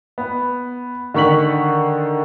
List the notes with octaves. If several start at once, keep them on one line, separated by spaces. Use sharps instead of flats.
B3
D3 D#3 C#6 B6 F#7